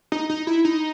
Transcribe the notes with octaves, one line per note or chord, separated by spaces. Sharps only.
D#4
D#4
E4
D#4